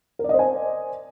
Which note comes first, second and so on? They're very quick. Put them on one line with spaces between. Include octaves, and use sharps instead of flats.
A#4 D5 D#5 C5 G#5